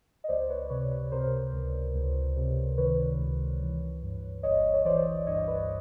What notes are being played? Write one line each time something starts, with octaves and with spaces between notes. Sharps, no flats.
D#5
C#2 C5 D5
B4 C#5
C3 B4 C#5
B4
C3 A#4 C5
C#2
C#2
C3
D#3 B4 C#5
C#2
E3
G2
G1 C#5 D#5
C#5
E3 C5 D5
G2 C#5 D#5
D5
B4 C#5